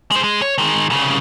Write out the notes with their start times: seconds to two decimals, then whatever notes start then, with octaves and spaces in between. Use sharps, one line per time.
0.11 G#3 C5
0.24 G#3
0.42 C#5
0.58 D#3 G#3
0.90 C2 C#3